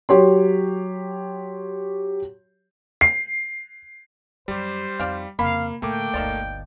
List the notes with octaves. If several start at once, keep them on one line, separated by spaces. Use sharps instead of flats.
F#3 G4 C#5 C6
C7
F#2 G3 G4 C5
F2 D#4 D5 F5
F2 C#3 A#3 F5 B5
A2 D3 A3 A#3 G5 D6
G1 D2 D#3 F3 D5